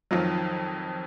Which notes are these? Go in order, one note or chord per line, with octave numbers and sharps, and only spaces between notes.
F2 D#3 F#3 F4